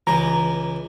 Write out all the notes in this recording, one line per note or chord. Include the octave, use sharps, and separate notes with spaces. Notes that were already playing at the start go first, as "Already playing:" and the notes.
C#2 E3 A#5